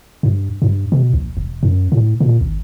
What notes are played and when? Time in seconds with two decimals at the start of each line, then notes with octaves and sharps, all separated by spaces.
0.23 G2
0.62 G2
0.92 B2
1.14 A#1
1.37 E1
1.63 F#2
1.92 A2
2.20 A#2
2.41 G#1